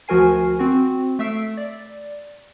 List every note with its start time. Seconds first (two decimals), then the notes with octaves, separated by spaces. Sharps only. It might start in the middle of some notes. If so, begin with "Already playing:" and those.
0.08 D2 F3 F#4 A#4 G#5 C7
0.59 C4 F#4
1.19 A3 E5 E6 C7 D7
1.57 D5